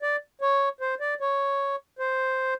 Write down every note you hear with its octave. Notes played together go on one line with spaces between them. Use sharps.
D5
C#5
C5
D5
C#5
C5